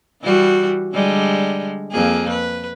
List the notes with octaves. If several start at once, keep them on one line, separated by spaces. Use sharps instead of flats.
E3 G3 F#4
D3 G3 G#3
F2 A#3 G#4
B4